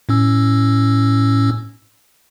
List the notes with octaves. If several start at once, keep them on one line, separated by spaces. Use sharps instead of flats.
A2 C#4 E6